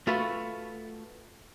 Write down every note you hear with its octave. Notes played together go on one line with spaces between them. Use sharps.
A3 F4 F#4 B4